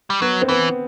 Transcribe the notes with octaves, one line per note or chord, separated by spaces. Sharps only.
G3
F#3 B3
C4
E3 B3